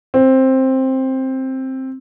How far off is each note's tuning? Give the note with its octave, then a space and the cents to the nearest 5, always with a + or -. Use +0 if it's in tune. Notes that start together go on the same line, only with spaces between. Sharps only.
C4 +10